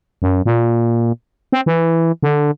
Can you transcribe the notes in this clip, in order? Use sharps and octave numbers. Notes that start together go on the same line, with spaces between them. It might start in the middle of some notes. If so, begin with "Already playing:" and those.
F#2
A#2
C4
E3
D3